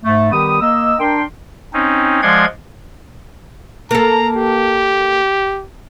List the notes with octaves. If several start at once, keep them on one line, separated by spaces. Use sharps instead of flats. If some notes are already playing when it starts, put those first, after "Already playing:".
G#2 A3
D#3 G3 B3 G4 D#6
A#3 D#5 E6
D4 A#4 G5 C6
C4 C#4 D#4
F3 G#3 D5 F#5 C6 G#6
A#3 A4 A#5
G4